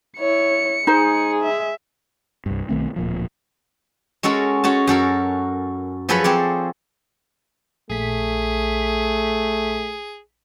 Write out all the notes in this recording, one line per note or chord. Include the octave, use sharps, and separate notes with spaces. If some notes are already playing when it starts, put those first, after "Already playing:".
E4 C#5 C#7
G#3 D#4 G#4 C5
E5
C2 G2
B1 D#3 A3 C4
D1 A#2 F3
G#3 C#4 F#4 A4 A#4
C#4 F#4 G#4 A5
F#2 F#4 A4 A#4
F3 F#3 G#4 A4 B4 C#5
C4 C#5 D5
A#1 A3 G#4 B6